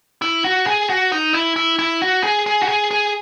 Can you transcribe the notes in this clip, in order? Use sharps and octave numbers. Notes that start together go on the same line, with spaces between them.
E4
F#4
G#4
F#4
D#4
E4
E4
E4
F#4
G#4
G#4
F#4
G#4
G#4